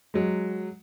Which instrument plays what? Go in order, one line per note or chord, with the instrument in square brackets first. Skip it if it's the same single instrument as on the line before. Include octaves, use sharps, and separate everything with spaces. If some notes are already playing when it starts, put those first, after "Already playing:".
[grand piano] F#3 G#3